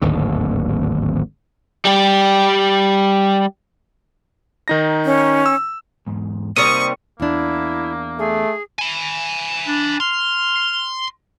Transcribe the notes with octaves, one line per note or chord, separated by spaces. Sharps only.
D1 G#1 D#2 D3
G3 G4
D#3 D#4 A#6
C#4
E6
E2 G#2
C3 G3 A#3 D#4 A#4 C#6 D#6
E2 A#3 D4 E4
A3 G#4
G#5 B5
D4
C6 F6